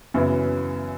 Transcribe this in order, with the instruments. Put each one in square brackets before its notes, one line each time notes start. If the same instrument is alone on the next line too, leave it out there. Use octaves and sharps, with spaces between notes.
[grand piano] F#2 C#3 E3 B3 E4